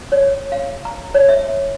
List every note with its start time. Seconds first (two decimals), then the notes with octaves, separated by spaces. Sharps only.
0.12 C#5
0.52 F5
0.85 A#5
1.14 C#5
1.29 E5